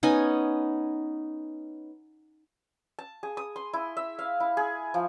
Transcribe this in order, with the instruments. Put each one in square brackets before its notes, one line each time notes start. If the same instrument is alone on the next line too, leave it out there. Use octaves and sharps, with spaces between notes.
[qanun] B3 C#4 D#4 G#5
[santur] A5
G#4
D#6
C6
E4
E5
F5
E4
G#4
F3